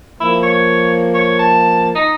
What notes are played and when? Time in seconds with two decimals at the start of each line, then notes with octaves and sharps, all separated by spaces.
0.20 F3 A#3 E4
0.43 C#5
1.14 C#5
1.39 A5
1.95 D#4